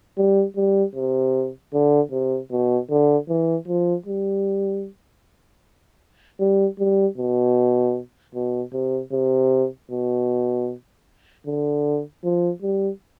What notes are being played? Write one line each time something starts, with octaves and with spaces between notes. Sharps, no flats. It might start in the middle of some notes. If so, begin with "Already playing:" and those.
G3
G3
C3
D3
C3
B2
D3
E3
F3
G3
G3
G3
B2
B2
C3
C3
B2
D3
F3
G3